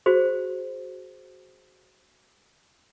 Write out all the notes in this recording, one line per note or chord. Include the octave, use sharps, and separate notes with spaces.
F#4 G#4 C5